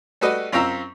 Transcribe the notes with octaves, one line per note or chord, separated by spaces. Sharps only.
G3 A3 F#4 B4 D#5
F#2 C4 F4 A#5 E6